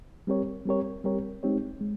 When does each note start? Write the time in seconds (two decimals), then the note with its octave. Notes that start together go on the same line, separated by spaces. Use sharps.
0.27 G3 C4 G4 A#4 C#5
0.66 G3 C4 G4 A#4 C#5
1.04 G3 C4 G4 A#4 C#5
1.43 G#3 C4 D#4 G4 C#5
1.81 G#3